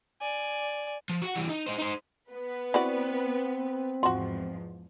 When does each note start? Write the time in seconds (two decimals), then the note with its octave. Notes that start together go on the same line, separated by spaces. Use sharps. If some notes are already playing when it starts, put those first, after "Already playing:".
0.21 D5 G#5
1.10 F3
1.22 F#4 F#5
1.35 E3 G3
1.49 D#4
1.66 D#4 C5
1.79 D#4 C5
2.30 B3 B4
2.74 C4 E4 F#4 D5
4.03 E2 G#2 F3 F4 F#4